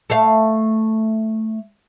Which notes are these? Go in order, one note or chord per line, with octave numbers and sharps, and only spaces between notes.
A3 F5